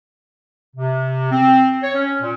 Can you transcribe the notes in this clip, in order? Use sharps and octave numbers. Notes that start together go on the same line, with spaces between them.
C3
C4
C#5
C#4
A#2